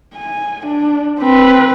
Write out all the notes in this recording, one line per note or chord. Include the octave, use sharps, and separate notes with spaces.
G#5
D4
C4 B4